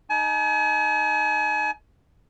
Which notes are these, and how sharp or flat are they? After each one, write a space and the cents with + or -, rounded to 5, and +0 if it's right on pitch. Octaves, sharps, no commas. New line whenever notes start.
D#4 +0 G#5 +40